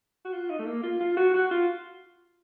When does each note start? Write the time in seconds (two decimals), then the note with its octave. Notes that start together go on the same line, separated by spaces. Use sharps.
0.25 F#4
0.33 F4
0.49 D#4
0.59 A3
0.66 A#3
0.83 F4
1.01 F4
1.17 F#4
1.34 F#4
1.51 F4